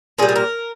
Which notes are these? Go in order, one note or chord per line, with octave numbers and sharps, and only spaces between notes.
A#2 G3 G#4
G#4
A#4